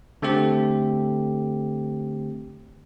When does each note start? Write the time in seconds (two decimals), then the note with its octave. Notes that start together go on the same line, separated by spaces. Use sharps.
0.22 D3 A3 C4 G4